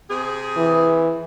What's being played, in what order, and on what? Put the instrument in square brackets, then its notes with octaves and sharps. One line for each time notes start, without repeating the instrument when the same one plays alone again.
[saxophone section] C3 G#4
[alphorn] E3